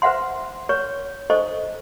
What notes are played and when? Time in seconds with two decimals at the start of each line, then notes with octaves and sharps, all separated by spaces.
0.02 B4 C5 E5 F#5 C6
0.69 B4 C#5 C#6
1.30 D#4 A4 C5 D#5 C#6